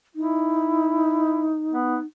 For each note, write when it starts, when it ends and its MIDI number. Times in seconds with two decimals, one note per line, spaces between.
0.16 2.06 63
0.16 1.52 64
1.71 1.98 59